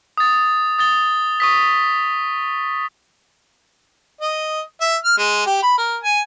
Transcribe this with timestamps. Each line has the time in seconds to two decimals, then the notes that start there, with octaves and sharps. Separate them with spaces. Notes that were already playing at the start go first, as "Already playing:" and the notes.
0.17 D#6 A6
0.79 D#6 A6 G7
1.40 C#6 D#6 B6
4.21 D#5
4.81 E5
5.04 F6
5.18 G#3
5.46 G4
5.63 B5
5.78 A#4
6.03 G#5